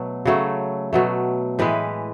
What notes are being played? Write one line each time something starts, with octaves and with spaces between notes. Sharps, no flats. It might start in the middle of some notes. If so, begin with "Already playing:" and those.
Already playing: B2 F#3 A3
C#3 F#3 A3
B2 F#3 A3
A2 E3 G#3 B4